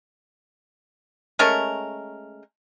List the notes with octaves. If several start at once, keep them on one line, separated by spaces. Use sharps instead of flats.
G#3 A3 C#4 A#4